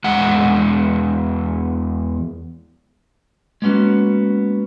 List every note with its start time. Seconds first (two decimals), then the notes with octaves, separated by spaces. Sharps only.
0.04 E2 G#3 F#5
3.62 G#3 A#3 B3 C#4 F#4